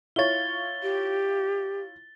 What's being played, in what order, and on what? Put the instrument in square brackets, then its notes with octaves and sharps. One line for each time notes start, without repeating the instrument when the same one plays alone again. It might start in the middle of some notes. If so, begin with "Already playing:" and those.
[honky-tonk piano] E4 F4 C#5 [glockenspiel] A6 G7
[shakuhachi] G4